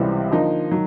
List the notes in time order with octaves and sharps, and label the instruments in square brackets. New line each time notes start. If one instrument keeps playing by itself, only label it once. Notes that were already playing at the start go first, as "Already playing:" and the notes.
Already playing: [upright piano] C#2 C3 E3 G3 C4
D3 F3 A#3 D#4
D#3 F#3